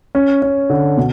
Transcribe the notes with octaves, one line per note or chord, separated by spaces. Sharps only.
C#4
C#4
D3
B2